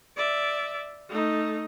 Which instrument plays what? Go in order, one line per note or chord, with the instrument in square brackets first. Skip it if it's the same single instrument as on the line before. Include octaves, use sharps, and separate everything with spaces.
[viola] D5 E5
A3 D#4